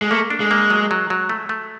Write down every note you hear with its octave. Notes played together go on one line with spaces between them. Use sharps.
G#3
A3 A#3
D4
G#3
A#3
F#3
F#3
F#3
A3
A3